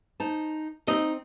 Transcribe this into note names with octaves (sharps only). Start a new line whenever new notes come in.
D#4 C5 A5
C4 D#4 D#5